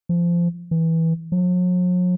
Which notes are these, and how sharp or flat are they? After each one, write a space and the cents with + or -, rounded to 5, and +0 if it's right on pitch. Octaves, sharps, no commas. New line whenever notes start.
F3 -20
E3 -15
F#3 -45